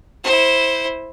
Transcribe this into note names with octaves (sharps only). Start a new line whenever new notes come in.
E4 C5